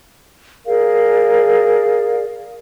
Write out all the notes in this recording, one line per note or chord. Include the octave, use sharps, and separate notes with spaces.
G#4 A#4 D5 F5